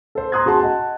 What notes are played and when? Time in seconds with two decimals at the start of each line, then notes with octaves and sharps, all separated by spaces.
0.15 A4 C5
0.32 A#5 C6 D#6 F#6 G#6
0.46 F#4 G#4 A5 C6
0.59 D#5 F#5 A5